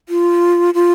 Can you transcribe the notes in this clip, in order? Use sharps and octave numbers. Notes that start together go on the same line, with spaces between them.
F4
F4